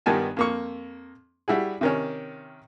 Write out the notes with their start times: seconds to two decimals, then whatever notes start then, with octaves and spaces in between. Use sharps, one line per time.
0.06 G2 D#3 G3 B3 G#5 A5
0.37 F2 A#3 C#6
1.48 G3 E4 F#4 G#4
1.81 C3 D#3 C#4